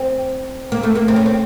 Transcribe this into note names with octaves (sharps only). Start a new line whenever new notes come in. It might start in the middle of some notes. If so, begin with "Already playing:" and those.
Already playing: C4
A#3
A3
A#3
C4
C#4
C4